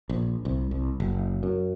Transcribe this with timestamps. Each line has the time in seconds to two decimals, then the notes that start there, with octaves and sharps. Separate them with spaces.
0.09 A#1
0.45 C2
0.71 C2
1.00 F#1
1.43 F#2